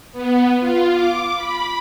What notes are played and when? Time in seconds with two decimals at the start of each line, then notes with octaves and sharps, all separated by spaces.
0.12 B3
0.60 F4
0.92 D6
1.36 B5